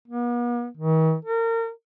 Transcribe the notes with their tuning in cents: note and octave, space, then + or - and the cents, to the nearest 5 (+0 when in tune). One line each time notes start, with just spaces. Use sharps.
B3 -45
D#3 +45
A#4 -30